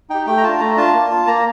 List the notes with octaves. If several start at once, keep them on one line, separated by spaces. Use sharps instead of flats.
D#4 G4 G5
A3 G5
A#5
D4 F4 A5
A3 A#5
D4 F4 A5
A#3
F4
A#3 A#5